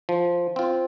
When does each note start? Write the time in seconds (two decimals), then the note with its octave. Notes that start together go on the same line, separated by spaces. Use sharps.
0.09 F3
0.56 C4 F4